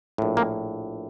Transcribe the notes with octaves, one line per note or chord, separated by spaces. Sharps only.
A#1 A2
A#3